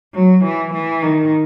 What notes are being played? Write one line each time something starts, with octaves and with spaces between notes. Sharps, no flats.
F#3
E3
E3
D#3